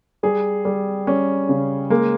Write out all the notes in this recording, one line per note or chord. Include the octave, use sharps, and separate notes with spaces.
G3 G#4
G3
G3 C#4
C#3
G#3 A#3